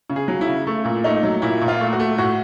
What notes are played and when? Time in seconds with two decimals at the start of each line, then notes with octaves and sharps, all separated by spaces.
0.10 C#3
0.16 G#4
0.28 F#3
0.41 E4
0.47 C#3
0.67 A3
0.85 A#2
1.04 A3 D#4
1.23 F#3
1.42 A#2 E4
1.61 A#2
1.68 F4
1.81 A3
1.93 F#4
2.00 A3
2.18 A2 F#4